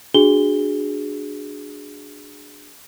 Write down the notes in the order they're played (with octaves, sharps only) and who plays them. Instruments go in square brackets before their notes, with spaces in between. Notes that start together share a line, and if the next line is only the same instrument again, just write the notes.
[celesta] D4 F#4 G#4 G7